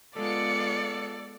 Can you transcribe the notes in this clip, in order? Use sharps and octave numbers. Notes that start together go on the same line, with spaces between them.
G#3 B3 F4 A4 D5 F5 C#7